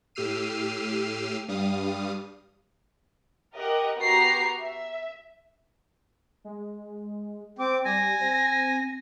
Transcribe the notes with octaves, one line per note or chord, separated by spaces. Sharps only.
A2 G4 E6 F6 C7 D#7
G2 G3 F5 D#6
G4 A#4 D#5 F#5
B3 F#4 G4 A#5 C7
E5
G#3
C4 D6
G3 G#5 A#6
C4